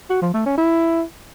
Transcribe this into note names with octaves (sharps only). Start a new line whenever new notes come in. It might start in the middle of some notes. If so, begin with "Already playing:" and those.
F#4
F3
A3
C#4
E4